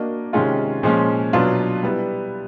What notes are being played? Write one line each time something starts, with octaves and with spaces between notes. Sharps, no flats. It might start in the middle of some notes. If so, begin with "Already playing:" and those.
Already playing: A#3 D4 F#4 A#4 D#5
C3 D#3 G#3 C#4 F4
A#2 F3 G#3 C#4
B2 F#3 B3 D4 F4
G3 B3 E4